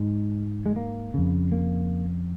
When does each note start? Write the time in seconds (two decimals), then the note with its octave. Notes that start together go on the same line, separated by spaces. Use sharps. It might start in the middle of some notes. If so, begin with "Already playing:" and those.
Already playing: G#2 G#3
0.66 G#3
0.76 A#3
1.14 F2 C#3
1.52 A#3